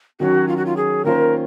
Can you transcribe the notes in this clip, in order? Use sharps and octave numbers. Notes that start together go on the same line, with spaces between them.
D#3 F#3 C#4 F#4
F4
F#4
F4
G#4
D#3 A#3 C#4 F4 A#4 C5